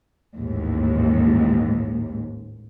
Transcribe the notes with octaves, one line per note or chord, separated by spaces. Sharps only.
A1 D#2 G#2